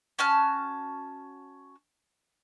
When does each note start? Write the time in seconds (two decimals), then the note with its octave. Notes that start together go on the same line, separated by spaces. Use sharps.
0.19 C#4 F#4 A5 F6